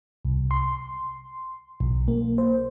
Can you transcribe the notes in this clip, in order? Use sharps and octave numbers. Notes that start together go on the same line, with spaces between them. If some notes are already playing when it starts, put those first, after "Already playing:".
C2
C6
B1
A#3
C5